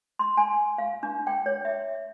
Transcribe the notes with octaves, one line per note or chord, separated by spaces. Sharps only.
C6
G#5
F5
D4
G5
C#5
E5